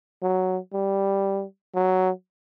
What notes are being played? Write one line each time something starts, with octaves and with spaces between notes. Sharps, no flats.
F#3
G3
F#3